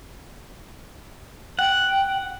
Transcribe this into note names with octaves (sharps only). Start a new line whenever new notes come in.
F#5 G5